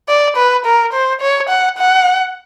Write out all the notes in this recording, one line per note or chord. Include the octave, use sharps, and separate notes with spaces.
D5
B4
A#4
C5
C#5
F#5
F#5